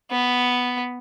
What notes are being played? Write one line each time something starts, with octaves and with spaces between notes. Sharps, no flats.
B3